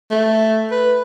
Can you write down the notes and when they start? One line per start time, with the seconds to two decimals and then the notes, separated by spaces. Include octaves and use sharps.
0.11 A3
0.71 B4